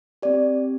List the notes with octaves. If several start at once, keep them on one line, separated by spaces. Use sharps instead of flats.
C4 G4 D5